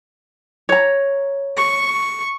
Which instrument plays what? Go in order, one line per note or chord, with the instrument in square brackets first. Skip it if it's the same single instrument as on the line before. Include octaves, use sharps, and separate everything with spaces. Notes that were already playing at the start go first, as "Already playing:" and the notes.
[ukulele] C#5 A#5
[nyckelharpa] C#6